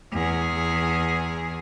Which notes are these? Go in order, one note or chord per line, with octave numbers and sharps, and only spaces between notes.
E2 G#4